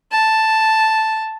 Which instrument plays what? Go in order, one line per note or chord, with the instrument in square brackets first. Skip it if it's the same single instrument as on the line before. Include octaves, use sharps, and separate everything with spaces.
[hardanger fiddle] A5